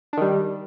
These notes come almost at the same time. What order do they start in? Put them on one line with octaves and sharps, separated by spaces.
D4 D#3 G3